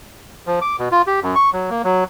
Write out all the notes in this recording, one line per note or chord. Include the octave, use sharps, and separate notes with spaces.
F3
D6
B2
F4
G4
F#2
C#6
F#3
A#3
F#3